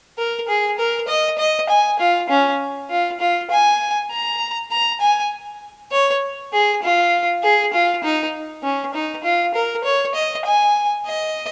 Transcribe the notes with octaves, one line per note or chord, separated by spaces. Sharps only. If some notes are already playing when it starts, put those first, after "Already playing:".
A#4
G#4
A#4
D#5
D#5
G#5
F4
C#4
F4
F4
G#5
A#5
A#5
G#5
C#5
G#4
F4
G#4
F4
D#4
C#4
D#4
F4
A#4
C#5
D#5
G#5
D#5